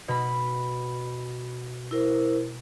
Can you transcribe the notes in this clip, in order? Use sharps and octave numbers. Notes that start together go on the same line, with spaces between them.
B2 B5
E4 A#4 C5